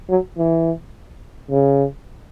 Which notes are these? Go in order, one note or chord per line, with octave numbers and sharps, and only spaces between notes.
F#3
E3
C#3